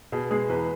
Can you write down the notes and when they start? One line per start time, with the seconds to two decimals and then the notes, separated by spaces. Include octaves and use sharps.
0.12 B2 G#4
0.31 G#3 G#4
0.49 E2 B4